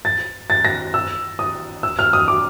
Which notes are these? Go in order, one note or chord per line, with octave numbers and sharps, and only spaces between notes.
A6
A6
A#6
E6
D#6
E6
F6
D#6
D6